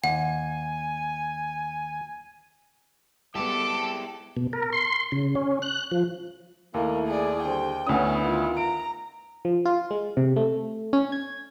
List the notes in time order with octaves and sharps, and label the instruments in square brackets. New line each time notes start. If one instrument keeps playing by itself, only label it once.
[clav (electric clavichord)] D#2 [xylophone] F#5 [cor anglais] G#5
[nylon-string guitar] G3 G#3 B3 [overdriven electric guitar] E4 G4 [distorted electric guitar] A4 [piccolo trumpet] D6
[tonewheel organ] B2
A#4
C6
C#3
C#4
F#6
F3
[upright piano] D#2 [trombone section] A3 E4 [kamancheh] A#3
[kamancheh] G#4 D5
[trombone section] D3 G3 C5 [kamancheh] G5
[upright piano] D2 D#6 [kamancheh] B3 E4 [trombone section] C#4
[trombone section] D#3 F4
[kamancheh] A#5 [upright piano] D7
[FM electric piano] F3
F4
G#3
C3
A3
C#4
G#6